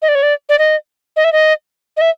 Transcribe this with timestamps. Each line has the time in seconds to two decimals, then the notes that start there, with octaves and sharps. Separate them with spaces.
0.02 D#5
0.08 D5
0.15 C#5
0.23 D5
0.49 D5
0.58 D#5
1.16 D#5
1.24 E5
1.32 D#5
1.97 D#5
2.01 E5